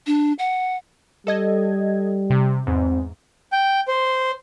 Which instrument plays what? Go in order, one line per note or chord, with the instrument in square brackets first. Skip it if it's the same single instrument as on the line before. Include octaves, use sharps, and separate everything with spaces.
[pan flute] D4
F#5
[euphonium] G3 [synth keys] A4 D#5 G#6
[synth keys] C3
[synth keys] E2 G#2 [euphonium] C4
[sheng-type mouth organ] G5
C5